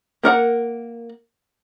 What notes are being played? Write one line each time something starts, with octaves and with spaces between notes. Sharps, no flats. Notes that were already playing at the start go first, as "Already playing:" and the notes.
A#3 A#4 F#5 A#5